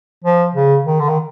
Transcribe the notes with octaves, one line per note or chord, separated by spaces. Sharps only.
F3
C#3
D#3
D3
D#3